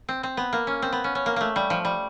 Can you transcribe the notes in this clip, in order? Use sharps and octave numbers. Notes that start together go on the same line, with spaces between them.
C4
C4
B3
A#3
C#4
C4
B3
C#4
C#4
A#3
A3 A#3
G3
F3
G3